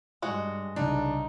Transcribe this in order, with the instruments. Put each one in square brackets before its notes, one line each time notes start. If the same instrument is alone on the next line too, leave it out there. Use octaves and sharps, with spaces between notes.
[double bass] G2 [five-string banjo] G#3 F#4
[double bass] C2 C#3 [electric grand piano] D4 [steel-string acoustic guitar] D#4